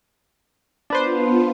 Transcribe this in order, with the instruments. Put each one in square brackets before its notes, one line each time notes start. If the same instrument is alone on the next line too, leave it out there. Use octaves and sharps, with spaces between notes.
[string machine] B3 F4 [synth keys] D4 B4 C5